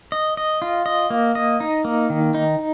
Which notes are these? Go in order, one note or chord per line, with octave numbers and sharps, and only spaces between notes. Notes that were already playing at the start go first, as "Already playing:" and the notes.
D#5
D#5
F4
D#5
A#3
D#5
D#4
A#3
D#3
D#4